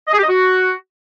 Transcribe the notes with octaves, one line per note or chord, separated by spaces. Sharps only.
D#5
G#4
G4
D#5
F#4